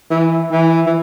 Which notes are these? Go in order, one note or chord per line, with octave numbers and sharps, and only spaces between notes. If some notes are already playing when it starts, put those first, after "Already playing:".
E3
E3
E3